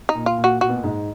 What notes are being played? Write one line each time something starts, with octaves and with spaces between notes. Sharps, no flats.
D#4
A#2
F4
A#2
F#4
A#2 F#4
B2
A#2
G#2